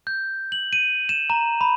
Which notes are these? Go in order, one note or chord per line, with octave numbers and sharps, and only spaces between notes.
G6
F#7
D#7
E7
A#5
B5